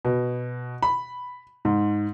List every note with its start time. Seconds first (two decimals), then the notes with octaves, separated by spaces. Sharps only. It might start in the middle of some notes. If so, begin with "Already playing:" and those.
0.05 B2
0.83 B5
1.65 G#2